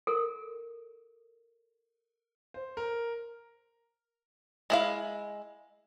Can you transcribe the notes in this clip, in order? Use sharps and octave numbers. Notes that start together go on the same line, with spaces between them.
A4 A#4
C5
A#4
G#3 E4 F5